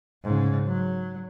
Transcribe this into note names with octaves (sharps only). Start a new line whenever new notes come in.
G#2 C#3
F#3